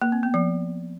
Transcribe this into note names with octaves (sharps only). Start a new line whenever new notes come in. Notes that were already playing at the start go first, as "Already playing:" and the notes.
A#3
C4
B3
F3